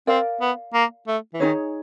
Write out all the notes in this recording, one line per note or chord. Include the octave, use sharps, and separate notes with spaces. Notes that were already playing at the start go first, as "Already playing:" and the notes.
C4 A#4 D5 F5
B3
A#3
A3
E3
D#3 D#4 G#4 C#5